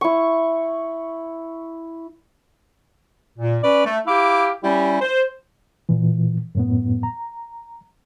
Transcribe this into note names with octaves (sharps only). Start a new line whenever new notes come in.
E4 C#6
A#2
C#4 B4 D5
A3
E4 G4 F5 D6
G3 C#4 E4 G4
C5
A#2 E3
F#2 A2 B3
A#5